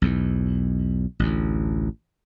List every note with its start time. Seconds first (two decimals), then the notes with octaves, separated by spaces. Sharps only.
0.02 B1 E2
1.19 A1 D2